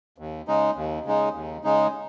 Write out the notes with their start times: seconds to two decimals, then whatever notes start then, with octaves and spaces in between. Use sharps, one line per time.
0.18 D#2
0.48 C#3 G#3 D#4
0.76 D#2
1.06 C#3 G#3 D#4
1.34 D#2
1.63 C#3 G#3 D#4